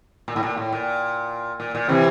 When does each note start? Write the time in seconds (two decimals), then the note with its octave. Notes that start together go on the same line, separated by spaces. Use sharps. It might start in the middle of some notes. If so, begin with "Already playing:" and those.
0.28 A#2
0.36 A2
0.43 A#2
0.58 A2
0.72 A#2
1.60 A#2
1.75 A#2
1.89 C3 E3